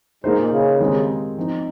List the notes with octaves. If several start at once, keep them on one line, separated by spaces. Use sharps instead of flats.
G#2 A#3 D#4 G#4 C5
A#2
C#3
D#3 G#3 C4 D#4 G4
F3 C4 D#4